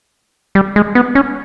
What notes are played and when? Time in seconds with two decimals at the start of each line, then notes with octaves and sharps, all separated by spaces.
0.55 G3
0.76 G#3
0.95 B3
1.15 C#4